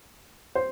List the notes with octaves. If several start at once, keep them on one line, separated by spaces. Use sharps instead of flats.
C5